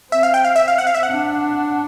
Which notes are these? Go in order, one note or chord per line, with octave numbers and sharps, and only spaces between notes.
C4 E5
F5
G5
F5
E5
F5
F#5
F5
E5
F#5
D4